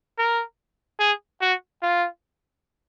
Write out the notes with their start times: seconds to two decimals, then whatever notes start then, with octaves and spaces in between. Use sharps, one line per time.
0.18 A#4
0.99 G#4
1.41 F#4
1.82 F4